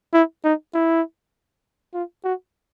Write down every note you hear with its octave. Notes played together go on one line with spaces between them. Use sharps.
E4
D#4
E4
F4
F#4